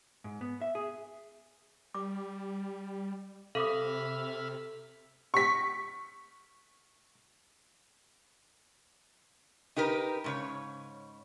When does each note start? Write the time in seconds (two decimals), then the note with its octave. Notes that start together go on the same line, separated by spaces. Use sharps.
0.24 G#2
0.41 B3
0.61 E5
0.75 G#4
1.94 G3 D6
3.55 C3 A4 E5 F5 B5 D6 D#6 F6
5.34 C#6 B6
9.76 D#4 G4 A#4 B4
10.24 G#2 C#3 C#5